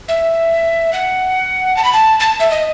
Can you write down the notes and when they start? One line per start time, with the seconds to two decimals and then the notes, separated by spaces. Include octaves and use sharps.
0.08 E5
0.93 F#5
1.77 A5
1.85 B5
1.93 A5
2.20 A5
2.40 E5
2.51 D#5